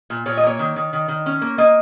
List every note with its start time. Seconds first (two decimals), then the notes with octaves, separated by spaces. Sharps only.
0.10 A#2
0.26 A#2 C#5
0.37 D#5
0.43 A#3 C#5
0.59 D#3
0.76 D#3
0.93 D#3
1.08 D#3
1.26 C#4
1.41 A#3
1.58 A#3 D#5